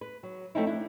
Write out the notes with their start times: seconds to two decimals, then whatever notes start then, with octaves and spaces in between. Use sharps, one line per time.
0.01 B4
0.23 F#3
0.55 F3 A3 C4 C#4 D#4 E4
0.67 D4 E4